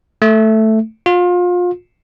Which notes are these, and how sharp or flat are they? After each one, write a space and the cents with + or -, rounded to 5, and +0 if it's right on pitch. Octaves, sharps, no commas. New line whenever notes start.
A3 +0
F4 +30